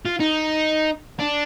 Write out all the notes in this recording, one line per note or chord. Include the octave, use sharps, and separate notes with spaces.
F4
D#4
D4